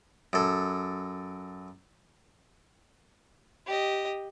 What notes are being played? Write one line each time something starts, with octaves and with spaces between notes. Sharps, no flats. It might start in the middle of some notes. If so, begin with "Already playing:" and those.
F#2 A4
G4 D#5